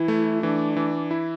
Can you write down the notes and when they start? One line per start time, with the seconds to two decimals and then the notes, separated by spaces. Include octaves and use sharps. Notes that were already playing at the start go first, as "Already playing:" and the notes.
Already playing: E3 E4
0.08 A3
0.43 E3 D4
0.76 E3
1.11 E4